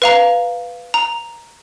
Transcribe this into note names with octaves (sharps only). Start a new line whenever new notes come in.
B4 F5 A#5
A#5